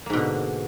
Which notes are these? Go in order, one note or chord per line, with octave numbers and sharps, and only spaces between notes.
G#2 B2 D3 A#3